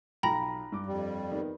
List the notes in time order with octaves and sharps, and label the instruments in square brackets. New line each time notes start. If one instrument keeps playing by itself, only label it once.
[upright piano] B1 F4 A#6 [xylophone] G5 A#5 B5
[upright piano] G2 D6
[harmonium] F2 G3
[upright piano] D#3 B3